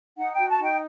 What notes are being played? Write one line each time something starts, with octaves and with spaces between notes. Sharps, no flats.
D#4 F#5
F#4 G5
A5
D#4 G5